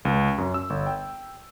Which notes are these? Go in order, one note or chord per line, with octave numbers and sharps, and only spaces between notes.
C#2
F#2
E6
G1
G5